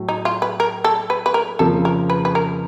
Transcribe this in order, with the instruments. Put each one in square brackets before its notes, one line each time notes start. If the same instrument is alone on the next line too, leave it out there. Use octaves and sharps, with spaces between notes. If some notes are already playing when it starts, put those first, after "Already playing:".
Already playing: [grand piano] A2 F#3 A3
[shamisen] D#4
F4
B4
A#4
A4
B4
B4
A#4
[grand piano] F2 C#3 F3 A#3 [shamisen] A4
[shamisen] A#4
B4
B4
A#4